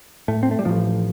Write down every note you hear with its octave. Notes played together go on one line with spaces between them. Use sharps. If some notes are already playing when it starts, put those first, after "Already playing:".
A2 A3
C4
A3
G3
A1 A2 F3